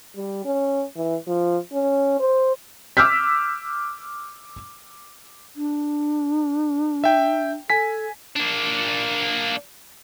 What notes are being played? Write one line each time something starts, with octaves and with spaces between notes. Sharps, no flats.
G3
C#4
E3
F3
C#4
C5
D6 E6 F6 G6 B6
D4
E5 G5
A4 G#5 B6
A#3 D4